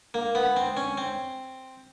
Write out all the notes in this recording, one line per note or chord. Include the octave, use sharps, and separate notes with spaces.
A#3
B3
C4
C#4
C4